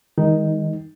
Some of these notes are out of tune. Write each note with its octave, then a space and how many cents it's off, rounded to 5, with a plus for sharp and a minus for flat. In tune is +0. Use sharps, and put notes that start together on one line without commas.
D#3 +25 G#3 -25 D#4 +0